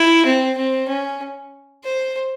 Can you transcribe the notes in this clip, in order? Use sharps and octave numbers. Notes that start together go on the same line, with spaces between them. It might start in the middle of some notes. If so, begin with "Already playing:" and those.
Already playing: E4
C4
C4
C#4
C5